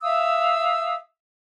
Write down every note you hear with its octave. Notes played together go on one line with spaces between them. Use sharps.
E5 F5 D#6 E6